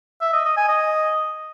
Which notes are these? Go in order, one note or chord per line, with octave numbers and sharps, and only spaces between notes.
E5
D#5
D#5
G#5
D#5